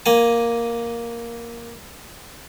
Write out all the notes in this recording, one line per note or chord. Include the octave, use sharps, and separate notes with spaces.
A#3 G#5